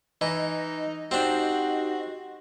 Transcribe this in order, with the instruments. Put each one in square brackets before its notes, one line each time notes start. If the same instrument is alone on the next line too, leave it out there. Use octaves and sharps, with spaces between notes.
[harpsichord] E3 [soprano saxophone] D#4 [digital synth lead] D#5
[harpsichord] C4 D4 [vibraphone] D#4 G4 [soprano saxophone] F#4